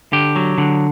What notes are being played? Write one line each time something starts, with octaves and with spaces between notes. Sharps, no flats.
D3 G4
F#3
D3